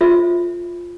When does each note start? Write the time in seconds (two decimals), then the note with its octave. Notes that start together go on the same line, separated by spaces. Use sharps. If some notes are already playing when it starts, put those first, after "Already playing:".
0.01 F4 A4 C5 E5